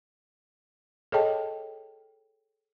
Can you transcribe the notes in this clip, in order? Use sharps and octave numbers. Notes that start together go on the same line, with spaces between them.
G#4 A4 C#5 D#5 G5 A5